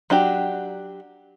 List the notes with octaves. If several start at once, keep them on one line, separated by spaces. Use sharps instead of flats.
F#3 D4 F#4 G4